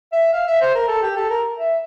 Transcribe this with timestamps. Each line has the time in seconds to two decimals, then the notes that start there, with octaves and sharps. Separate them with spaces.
0.12 E5
0.33 F5
0.47 E5
0.61 C5
0.75 A#4
0.88 A4
1.02 G4
1.16 A4
1.30 A#4
1.58 E5